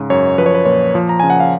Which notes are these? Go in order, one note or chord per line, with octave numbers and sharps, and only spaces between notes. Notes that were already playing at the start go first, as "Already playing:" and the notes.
Already playing: G#2 C#3
F#2 C#5
F3 B4
C#5
B4
A#2 C#5
F3
A#5
C#3 G#5
F#5
F5